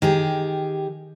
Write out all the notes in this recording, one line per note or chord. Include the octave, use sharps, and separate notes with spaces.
D#3 G4 G#4